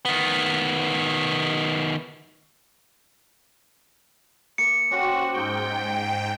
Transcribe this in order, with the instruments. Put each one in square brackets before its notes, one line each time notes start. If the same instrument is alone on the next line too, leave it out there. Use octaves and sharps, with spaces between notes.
[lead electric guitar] D#3 B3
[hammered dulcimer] A#3 [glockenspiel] C#7
[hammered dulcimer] C#4 G4 C5 [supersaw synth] F#4
[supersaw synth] G#2 G5